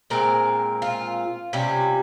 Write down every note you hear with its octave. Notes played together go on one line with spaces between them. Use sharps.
A#2 G#3 C4 A#4
F4
C3 G3 C#4